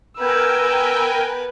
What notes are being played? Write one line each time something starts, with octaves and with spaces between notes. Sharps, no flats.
B3 A#4 B4 G5 G#5 E6